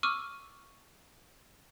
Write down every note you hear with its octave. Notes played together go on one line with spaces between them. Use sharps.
C#6 D6 E6 F6 D#7